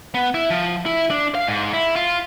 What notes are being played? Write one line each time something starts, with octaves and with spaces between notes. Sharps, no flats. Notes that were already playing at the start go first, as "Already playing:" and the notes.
B3
E4
F3
E4
D4
F5
G#2
E4
F4